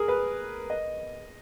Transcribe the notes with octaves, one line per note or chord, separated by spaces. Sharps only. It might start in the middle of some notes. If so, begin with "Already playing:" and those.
Already playing: G#4 A#4
B4
D#5